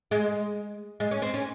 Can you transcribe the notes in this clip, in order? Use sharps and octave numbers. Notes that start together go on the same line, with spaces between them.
G#3
G#3
C#4
C4
C#4